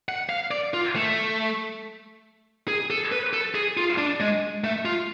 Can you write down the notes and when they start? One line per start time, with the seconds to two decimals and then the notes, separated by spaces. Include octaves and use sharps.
0.09 F#5
0.29 F5
0.51 D5
0.74 F4
0.96 A3
2.68 G#4
2.90 A4
3.12 B4
3.33 A4
3.55 G#4
3.77 F4
3.98 D4
4.20 G#3
4.64 A3
4.85 F4